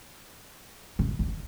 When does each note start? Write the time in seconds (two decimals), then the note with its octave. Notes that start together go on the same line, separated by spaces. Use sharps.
0.99 C#3
1.19 D3